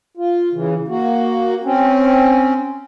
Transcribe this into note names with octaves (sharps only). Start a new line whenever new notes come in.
F4
C#3 E3
A#3 F#4
C4 C#4